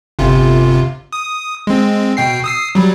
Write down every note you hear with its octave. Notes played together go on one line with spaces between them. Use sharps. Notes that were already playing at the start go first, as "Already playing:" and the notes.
G1 C3 F4
D#6
G#3 C4
B2 G5 C7
D#6 E6 C7
F#3 G3